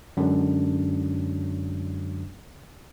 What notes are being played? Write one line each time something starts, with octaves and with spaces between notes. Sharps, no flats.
F#2 D3 F#3 G#3 C#4 D4